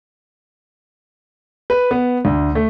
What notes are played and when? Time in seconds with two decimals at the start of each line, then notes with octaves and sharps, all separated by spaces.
1.70 B4
1.91 B3
2.25 D2
2.55 A3